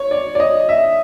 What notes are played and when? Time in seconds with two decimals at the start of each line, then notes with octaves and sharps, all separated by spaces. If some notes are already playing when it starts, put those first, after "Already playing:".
Already playing: C#5
0.11 D5
0.35 D5
0.40 D#5
0.69 E5